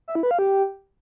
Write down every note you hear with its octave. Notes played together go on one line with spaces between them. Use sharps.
E5
E4
B4
F5
G4